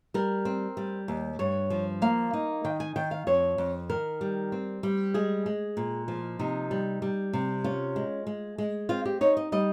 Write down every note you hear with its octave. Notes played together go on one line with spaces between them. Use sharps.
G3 A#4
C4
G3
D#2
G2 C#5
F3
A#3 F5
D#4
D#3 G5
G#5
D#3 G5
F5
F2 C#5
F2
D#3 A#4
G3
C4
G3
G#3 G#4
G#3
A#2
F3
C3 D#4
G3
G3
C3
C#4 F4
G#3
G#3
G#3
C4 F4
G4
D#4 C#5
D#5
G3 D#5